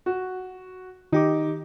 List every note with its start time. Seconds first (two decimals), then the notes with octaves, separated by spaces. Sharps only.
0.06 F#4
1.12 D#3 D#4 G4 D6